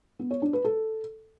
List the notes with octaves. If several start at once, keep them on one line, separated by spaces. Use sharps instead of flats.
B3
C#5
D4
B4
A4